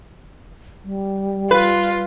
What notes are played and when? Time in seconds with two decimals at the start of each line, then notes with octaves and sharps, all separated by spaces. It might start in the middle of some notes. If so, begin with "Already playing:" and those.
0.84 G3
1.51 F4 B4